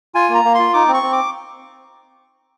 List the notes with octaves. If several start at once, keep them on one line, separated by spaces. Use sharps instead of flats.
F4 G#5
A#3
A#5
A#3
C6
F4
D#4 D6
C4
C#6
C4
D6